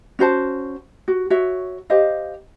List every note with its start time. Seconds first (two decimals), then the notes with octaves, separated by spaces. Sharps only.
0.19 C#4 F#4 C5 A5
1.08 F#4
1.30 F#4 C#5 E5
1.90 G4 C5 D#5 F5